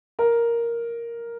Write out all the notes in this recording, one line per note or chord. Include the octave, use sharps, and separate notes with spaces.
A#4